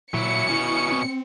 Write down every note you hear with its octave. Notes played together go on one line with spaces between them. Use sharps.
A#2 F#3 E4 C#7
B2 C#4 E4
C4